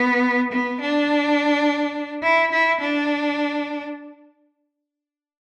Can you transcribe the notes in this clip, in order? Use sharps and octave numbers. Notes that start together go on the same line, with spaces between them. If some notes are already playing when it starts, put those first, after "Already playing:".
Already playing: B3
B3
D4
E4
E4
D4